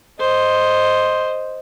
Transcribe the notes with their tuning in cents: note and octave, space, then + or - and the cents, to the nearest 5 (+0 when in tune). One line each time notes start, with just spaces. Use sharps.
C5 +0 D#5 +0